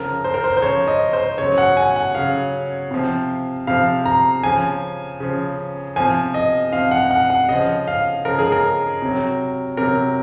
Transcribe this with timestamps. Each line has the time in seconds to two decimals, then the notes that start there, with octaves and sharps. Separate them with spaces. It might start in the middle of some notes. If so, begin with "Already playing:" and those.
Already playing: C#3 F3 A#4
0.24 C5
0.34 A#4
0.44 C5
0.57 C5
0.62 C#3 F3 C#5
0.87 D#5
1.13 C5
1.38 C#3 F#3 C#5
1.58 F#5
1.77 G#5
1.96 F#5
2.15 C#3 F#3 F5
2.91 C3 F3
3.67 C3 F3 F5
4.05 A#5
4.43 C#3 F3 G#5
5.20 C#3 F3
5.96 C3 F3 G#5
6.34 D#5
6.73 C3 F3 F5
6.91 F#5
7.11 F#5
7.30 F#5
7.49 C#3 F3 D#5
7.88 F5
8.25 C#3 F3 A#4
8.39 G#4
8.52 A#4
9.02 C3 F#3
9.77 C3 F#3 A#4